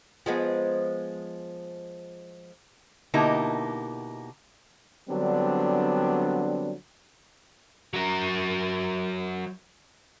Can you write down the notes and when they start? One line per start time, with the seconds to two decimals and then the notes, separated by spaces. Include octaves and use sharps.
0.26 F3 G#3 B3
3.14 B2 D3 A#3 D#4 E4 G4
5.09 D3 F#3 G3 B3 C4 D4
7.94 F#3 A#4